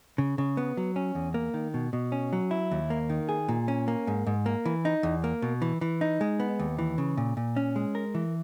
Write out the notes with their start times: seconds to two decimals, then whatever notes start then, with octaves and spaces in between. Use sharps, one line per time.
0.18 C#3
0.38 C#3
0.57 B3
0.77 F#3
0.96 C#4
1.15 E2
1.34 A#3
1.54 D#3
1.74 B2
1.93 B2
2.12 C#4
2.33 F#3
2.51 E4
2.71 D#2
2.90 A#3
3.09 D#3
3.29 G#4
3.49 A#2
3.68 C#4
3.88 A#3
4.07 G#2
4.27 G#2
4.46 A#3
4.65 E3
4.85 D#4
5.03 E2
5.24 A#3
5.42 B2
5.62 E3
5.81 E3
6.01 D#4
6.21 G#3
6.40 B3
6.59 D#2
6.78 E3
6.98 C#3
7.17 A#2
7.37 A#2
7.56 C#4
7.76 G#3
7.95 A#4
8.15 E3